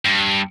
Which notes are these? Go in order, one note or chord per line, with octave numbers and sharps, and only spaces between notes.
G2